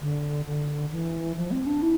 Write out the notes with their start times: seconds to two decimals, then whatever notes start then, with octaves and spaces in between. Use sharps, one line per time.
0.01 D3
0.45 D3
0.92 E3
1.37 F3
1.51 C4
1.66 D4
1.82 E4